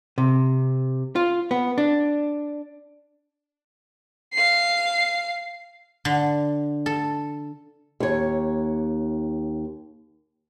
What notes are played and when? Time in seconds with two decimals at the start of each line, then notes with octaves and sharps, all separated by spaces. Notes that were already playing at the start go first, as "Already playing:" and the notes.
0.18 C3
1.16 F4
1.51 B3
1.78 D4
4.33 F5 C7
6.05 D3
6.86 A4
8.00 D#2 C#5